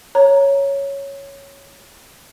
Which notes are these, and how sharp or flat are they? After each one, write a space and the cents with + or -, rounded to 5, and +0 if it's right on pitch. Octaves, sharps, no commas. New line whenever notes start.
C#5 +0 A#5 +0